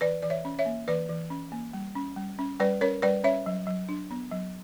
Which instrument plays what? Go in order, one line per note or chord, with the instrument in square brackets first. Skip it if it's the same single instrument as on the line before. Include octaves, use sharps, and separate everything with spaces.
[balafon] E3 B4 D5
E3 D5
C#5 E5
C#4
C#5 E5
A#3
E3 B4 D5
E3
C#4
A#3
G3
C#4
G3
C#4
G3 B4 D5
C#4 A#4 C#5
G3 B4 D5
C#4 C#5 E5
F#3
F#3
D4
B3
F#3